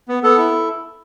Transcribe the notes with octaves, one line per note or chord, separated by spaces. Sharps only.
B3
B3 A4
E4